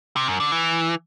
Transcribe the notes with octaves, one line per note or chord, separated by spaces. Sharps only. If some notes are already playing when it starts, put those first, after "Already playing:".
C3
F#2
D3
E3